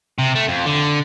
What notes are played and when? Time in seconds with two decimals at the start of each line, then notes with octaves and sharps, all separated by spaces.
0.18 C3
0.35 A3
0.48 F2
0.66 D3